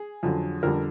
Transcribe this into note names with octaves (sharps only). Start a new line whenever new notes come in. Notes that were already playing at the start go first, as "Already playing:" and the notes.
Already playing: G#4
F2 D3 F#3
F2 D3 G3 A#4